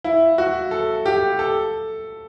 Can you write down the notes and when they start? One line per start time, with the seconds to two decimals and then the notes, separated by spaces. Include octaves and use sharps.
0.04 E4
0.38 F#4
0.71 A4
1.06 G4
1.39 A4